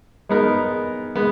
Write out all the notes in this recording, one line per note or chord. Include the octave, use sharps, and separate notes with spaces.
G#3 B3 D#4 A#4
G#3 B3